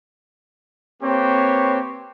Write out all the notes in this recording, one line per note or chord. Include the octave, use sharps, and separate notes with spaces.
A#3 C4 G4 B4 C#5